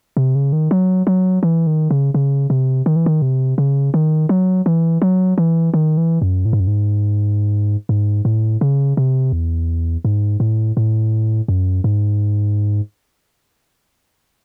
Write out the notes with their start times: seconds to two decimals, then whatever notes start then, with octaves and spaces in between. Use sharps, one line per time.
0.17 C3
0.35 C#3
0.53 D#3
0.71 F#3
1.07 F#3
1.43 E3
1.67 D#3
1.91 C#3
2.14 C#3
2.50 C3
2.86 D#3
2.96 E3
3.06 D#3
3.22 C3
3.58 C#3
3.94 D#3
4.29 F#3
4.66 E3
5.02 F#3
5.38 E3
5.74 D#3
5.97 E3
6.22 F#2
6.45 A2
6.53 G#2
6.60 F#2
6.67 G#2
7.89 G#2
8.25 A2
8.61 C#3
8.97 C3
9.33 E2
10.05 G#2
10.40 A2
10.77 A2
11.48 F#2
11.84 G#2